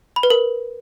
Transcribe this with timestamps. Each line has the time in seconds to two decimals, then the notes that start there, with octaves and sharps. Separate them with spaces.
0.16 B5
0.23 B4
0.30 A#4